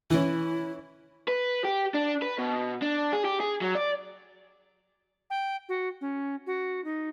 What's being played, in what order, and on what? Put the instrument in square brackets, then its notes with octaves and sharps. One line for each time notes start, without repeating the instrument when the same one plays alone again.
[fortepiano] E3 C#4 [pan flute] E4
[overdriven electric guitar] B4
G4
D4
B4
B2
D4
G#4
G4
G#4
F#3
D5
[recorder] G5
F#4
C#4
F#4
D#4